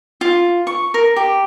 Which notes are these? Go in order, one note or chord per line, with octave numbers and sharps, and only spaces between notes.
F4
C#6
A#4
G4